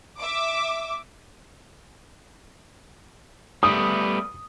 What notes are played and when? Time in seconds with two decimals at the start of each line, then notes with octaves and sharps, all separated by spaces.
0.18 E5 D6
3.63 G3 A3 B3 D#6